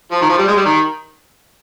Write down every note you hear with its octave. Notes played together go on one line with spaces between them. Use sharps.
F3
D#3
F3
G3
G#3
G3
D#3